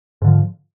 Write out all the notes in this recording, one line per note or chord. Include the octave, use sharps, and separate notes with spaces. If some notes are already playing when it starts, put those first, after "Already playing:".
G#2 D3 F3